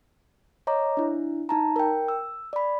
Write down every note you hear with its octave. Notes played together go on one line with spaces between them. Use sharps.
C#5 D#5 A#5 D6
D4 E4
D#4 A5 A#5
A#4 G5
E6
D5 B5